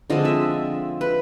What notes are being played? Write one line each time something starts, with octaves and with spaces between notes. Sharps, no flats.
D3 F3 G#3 C4 D#5
E5
B4